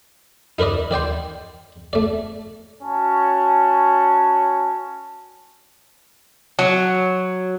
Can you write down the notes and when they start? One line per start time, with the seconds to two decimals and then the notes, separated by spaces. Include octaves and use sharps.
0.59 D#4 A#4 B4 D5 D#5
0.91 D#3 D5 G5 C6
1.93 A3 D5
2.83 C#4 F#4 C#5 A5
6.59 F#3